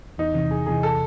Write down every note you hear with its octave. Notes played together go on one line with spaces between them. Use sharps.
E2 D#4
C3 E3
E2 G#4
C3 E3 G#4
A4